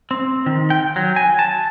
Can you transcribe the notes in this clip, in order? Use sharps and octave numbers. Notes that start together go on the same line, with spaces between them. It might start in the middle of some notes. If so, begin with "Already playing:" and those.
C4
D#3
G5
F#3
G#5
A5